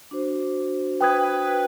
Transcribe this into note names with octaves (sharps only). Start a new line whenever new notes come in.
D4 F#4 C5
B4 G5 D#6 G#6